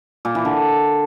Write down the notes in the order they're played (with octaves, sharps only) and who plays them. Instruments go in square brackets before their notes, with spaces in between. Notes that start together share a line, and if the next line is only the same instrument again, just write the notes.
[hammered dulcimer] A#2
E3
D3